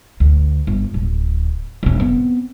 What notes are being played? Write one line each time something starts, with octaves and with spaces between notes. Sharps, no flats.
D2
G1
D1
E1 C#4
B3 C4